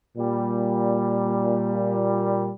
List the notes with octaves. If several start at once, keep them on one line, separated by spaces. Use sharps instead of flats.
A#2 G3